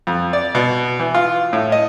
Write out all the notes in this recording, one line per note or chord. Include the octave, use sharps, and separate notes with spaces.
F2
D5
B2
E3
F4
A2
D#5